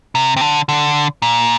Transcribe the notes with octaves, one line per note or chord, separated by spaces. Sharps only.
C3
C3
D3
D3
A#2